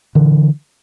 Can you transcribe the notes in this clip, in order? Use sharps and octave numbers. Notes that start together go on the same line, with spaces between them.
A#2 D3 E3